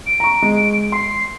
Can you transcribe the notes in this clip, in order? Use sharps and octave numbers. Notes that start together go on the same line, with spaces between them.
D7
A#5 C#6
G#3
C6 C7